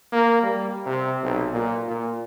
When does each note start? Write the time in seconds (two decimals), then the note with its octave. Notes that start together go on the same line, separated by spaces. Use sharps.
0.13 A#3
0.43 G3
0.86 C3
1.23 B1
1.54 A#2
1.88 A#2